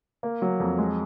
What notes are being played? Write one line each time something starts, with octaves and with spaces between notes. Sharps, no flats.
A#3
F#3
F2
G#3